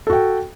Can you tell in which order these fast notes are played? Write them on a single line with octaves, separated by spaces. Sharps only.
A4 F#4 G5